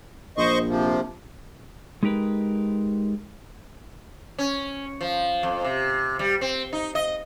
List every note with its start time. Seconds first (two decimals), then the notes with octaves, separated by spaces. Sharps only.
0.37 A#1 C5 D#5 C#6
0.68 C3 F3
2.03 G#3 D#4 G4 A#4 B4
4.38 C#4
5.01 F3
5.43 F2
5.65 C3
6.19 G3
6.41 C4
6.73 D#4
6.95 D#5